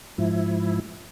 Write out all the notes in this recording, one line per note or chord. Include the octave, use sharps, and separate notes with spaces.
G#2 F3 E4